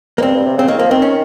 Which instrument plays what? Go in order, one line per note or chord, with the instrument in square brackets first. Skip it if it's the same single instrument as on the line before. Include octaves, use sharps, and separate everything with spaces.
[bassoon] F2 [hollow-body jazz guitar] A#3
[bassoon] G2 [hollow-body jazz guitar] C4
[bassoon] G2
C3
[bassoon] C#3 [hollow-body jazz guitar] C4
[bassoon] D#3 [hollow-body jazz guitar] A#3
[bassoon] F3 [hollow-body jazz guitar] A#3
[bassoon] D#3 [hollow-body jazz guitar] C4
[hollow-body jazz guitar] C#4